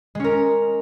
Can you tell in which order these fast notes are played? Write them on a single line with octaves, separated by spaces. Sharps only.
G#3 C#4 A#4